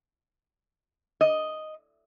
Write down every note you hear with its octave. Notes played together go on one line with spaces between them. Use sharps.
D#5